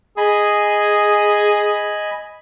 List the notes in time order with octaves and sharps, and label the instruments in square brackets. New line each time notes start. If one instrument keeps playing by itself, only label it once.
[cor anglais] G#4 [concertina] D#5 G#5 B5